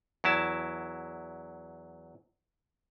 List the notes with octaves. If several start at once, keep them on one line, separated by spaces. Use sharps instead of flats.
E2 F#3 E4 A5